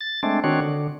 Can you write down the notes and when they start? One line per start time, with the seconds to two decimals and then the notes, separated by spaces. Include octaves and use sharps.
0.01 A6
0.23 G#3 A3 C4 D4
0.44 D#3 C4 D4 F#4 C#5
0.61 D3